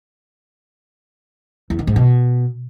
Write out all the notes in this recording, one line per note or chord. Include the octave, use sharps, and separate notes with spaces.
E2
D#3
G#2
B2